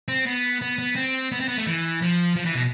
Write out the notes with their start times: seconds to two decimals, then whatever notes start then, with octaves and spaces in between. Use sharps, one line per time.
0.08 C4
0.26 B3
0.62 B3
0.79 B3
0.95 C4
1.32 B3
1.40 C4
1.48 B3
1.58 A3
1.67 E3
2.02 F3
2.36 F3
2.45 E3
2.54 B2